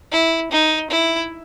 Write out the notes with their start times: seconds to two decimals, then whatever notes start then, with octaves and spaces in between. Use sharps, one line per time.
0.12 E4
0.51 D#4
0.91 E4